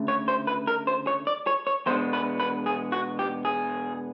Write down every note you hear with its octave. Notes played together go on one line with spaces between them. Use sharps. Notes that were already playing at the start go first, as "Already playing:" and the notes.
Already playing: D2 C#3 A3
C#5
C5
B4
A#4
C5
C#5
D5
C#5
C#5
E2 B2 G#3 B3 D4 C5
B4
B4
G#4
F#4
G4
G#4